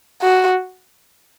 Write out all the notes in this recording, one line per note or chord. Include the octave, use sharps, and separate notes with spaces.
F#4